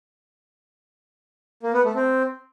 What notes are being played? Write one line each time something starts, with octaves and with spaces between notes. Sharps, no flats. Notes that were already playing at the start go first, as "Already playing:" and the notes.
A#3
B3
A3
C4